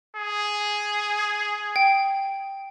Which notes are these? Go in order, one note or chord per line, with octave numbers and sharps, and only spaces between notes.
G#4
G5